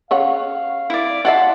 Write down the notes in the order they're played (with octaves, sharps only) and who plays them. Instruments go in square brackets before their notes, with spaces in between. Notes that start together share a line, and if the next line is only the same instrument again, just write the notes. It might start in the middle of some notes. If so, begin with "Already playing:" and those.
[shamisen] C#3 C#5 F#5 [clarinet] F5
[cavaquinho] E4 D5
[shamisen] E4 D5 E5 [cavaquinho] F#5 A5 C6